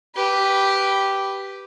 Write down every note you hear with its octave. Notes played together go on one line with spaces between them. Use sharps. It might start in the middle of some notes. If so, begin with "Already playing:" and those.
G4 B4